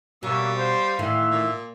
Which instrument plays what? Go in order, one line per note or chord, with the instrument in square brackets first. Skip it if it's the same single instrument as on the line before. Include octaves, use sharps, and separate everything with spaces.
[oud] B2 [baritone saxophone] G3 [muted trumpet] A#3 [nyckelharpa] C#5 E5
[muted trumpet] C5 [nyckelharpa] F5 C6
[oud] A2 D#3 E3 [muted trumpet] E5
[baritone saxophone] A#2